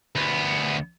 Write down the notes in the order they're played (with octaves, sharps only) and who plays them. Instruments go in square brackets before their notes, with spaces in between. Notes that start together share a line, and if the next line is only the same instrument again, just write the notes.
[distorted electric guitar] D2 B3